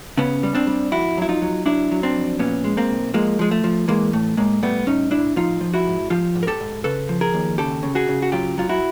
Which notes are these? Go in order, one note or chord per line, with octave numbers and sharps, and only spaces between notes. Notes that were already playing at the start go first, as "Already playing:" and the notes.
C#3 B3 C#4
G3
C4 D4
G3
F2 E4 F#4
F#3 E4
D#4 F4
F#3
F#3 D4 E4
F#3
C4 D4
F2
A#2 B3 C#4
G#3
A#3 C4
B1
F3 G#3 A#3
F3 G#3
A3
F3
E3 G#3 A#3
A2 A3
A2 G#3 A#3
G3 A3 B3
A2 C#4 D#4
A2 D4 E4
F3 D#4 F4
F3
E4 F#4
G#2
F3 F4 G4
G#2
A#4
G4 A4
G#2
C#3 A4 B4
F3
G#4 A#4
D#2
C#3 G4 A4
C#3
F#4 G#4
C#3
F#4
F#3 F4 G4
F#3 F4
E4 F#4